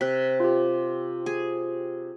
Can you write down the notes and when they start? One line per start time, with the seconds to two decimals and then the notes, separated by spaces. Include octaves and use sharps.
0.01 C3 F#6 B6
0.40 F4 G4
1.26 G#4